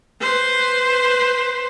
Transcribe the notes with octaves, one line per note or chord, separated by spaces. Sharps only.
B4 C5